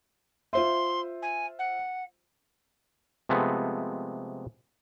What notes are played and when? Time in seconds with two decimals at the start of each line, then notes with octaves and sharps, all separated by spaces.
0.53 F4 C5 E5 C6
1.22 G#5
1.59 F#5
3.29 C3 F3 G#3 A3 B3